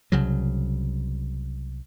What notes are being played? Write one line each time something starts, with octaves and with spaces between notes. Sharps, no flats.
C2 C#3 F#3